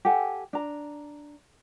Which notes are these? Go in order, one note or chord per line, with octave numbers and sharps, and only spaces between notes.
G4 A4 F#5 G#5
D4 A#5